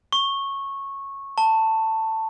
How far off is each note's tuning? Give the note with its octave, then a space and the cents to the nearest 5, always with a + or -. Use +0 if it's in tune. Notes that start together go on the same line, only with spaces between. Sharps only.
C#6 -15
A5 +15